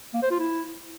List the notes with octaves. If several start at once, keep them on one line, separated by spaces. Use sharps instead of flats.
A#3
C5
F4
E4